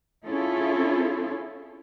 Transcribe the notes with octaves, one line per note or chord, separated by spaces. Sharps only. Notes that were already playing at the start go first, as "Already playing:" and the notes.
C#4 E4 F4 G#4 A4